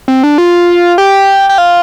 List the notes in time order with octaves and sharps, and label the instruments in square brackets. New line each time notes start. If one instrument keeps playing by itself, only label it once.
[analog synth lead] C4
D4
F4
G4
G4
F4